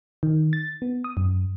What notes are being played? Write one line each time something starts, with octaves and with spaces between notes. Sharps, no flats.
D#3
A6
B3
D#6
F#2